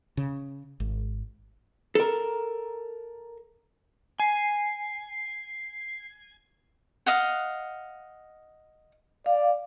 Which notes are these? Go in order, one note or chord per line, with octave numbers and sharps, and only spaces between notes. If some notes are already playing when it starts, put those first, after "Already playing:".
C#3
G#1
A4 A#4
G#5 C7
D#5 F5 F#5
D5 F5